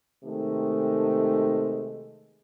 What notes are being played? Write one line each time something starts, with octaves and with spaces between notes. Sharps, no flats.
C3 D#3 G#3 A3